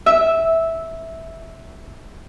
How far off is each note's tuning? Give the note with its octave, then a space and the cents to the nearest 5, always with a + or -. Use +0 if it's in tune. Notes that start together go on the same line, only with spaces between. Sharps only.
E5 -10